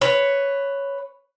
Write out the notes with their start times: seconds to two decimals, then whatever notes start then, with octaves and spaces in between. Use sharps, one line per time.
0.01 B4 C#5